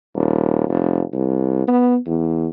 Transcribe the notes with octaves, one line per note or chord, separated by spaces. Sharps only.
D#1
F1
C2
B3
E2